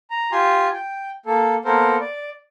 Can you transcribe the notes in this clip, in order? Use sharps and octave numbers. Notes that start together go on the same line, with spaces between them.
A#5
F4 G4 G#5 C6
G5
A#3 A4
A#3 B3 A4 A#4 C5
D5